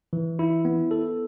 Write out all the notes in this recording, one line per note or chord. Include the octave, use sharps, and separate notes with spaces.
E3
E4
B3
A4